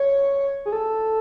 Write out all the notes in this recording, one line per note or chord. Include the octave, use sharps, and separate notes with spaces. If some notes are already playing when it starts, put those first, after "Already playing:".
Already playing: C#5
G#4
A4